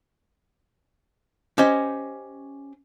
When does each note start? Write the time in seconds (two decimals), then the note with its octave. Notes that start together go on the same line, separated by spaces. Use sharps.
1.58 C#4 G4 C5 D#5 G#5